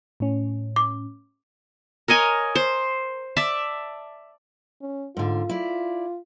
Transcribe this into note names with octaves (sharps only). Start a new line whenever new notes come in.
A2 C#4
D6
A#4 C#5 D#5 G#5
C5
D5 E5 A5
C#4
G#2 D3 F4
E4 D5